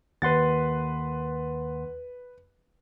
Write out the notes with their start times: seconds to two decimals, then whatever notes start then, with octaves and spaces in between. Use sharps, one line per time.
0.22 D#2 B4 F#5 C6 A6